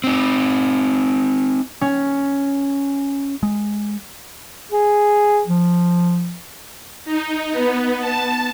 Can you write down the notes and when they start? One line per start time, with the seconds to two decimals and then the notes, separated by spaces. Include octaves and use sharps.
0.04 C4 D#4
1.81 C#4
3.43 G#3
4.72 G#4
5.47 F3
7.05 D#4
7.51 B3
8.00 A5